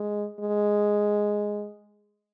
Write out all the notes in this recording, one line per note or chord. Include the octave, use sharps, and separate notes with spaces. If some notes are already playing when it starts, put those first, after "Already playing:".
Already playing: G#3
G#3